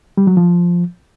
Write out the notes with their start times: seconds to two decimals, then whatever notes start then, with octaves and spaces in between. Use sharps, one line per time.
0.17 G3
0.27 F#3
0.37 F3